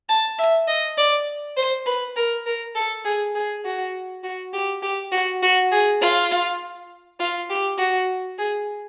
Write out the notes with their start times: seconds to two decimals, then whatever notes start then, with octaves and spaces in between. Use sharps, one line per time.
0.09 A5
0.38 E5
0.68 D#5
0.97 D5
1.57 C5
1.86 B4
2.16 A#4
2.46 A#4
2.75 A4
3.05 G#4
3.35 G#4
3.65 F#4
4.23 F#4
4.53 G4
4.82 G4
5.12 F#4
5.42 F#4
5.72 G#4
6.01 F4
7.20 F4
7.50 G4
7.78 F#4
8.38 G#4